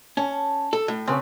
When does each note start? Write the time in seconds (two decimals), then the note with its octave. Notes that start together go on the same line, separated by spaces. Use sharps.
0.17 C#4 A5
0.73 A4
0.88 A2
1.07 C#3 C4 B4 C#5